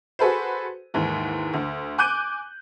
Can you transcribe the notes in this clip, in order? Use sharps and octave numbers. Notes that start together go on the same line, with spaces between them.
F#4 G#4 A4 B4 C5
D#2 G#2 E3
D2
G#5 D6 F#6 G6 D#7